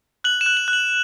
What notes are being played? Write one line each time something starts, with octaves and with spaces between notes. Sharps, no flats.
F#6 F#7
E7
F#6
F#7
F#6
F#7